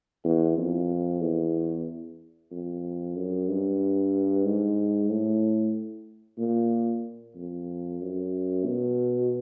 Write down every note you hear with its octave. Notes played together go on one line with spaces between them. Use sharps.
E2
F2
E2
F2
F#2
G2
G#2
A2
A#2
F2
F#2
B2